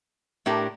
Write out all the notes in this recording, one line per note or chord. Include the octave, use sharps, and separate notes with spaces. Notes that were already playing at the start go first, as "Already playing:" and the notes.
A2 A3 D4 G4 A#4